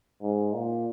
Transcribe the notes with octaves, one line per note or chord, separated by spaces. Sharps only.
G#2
A#2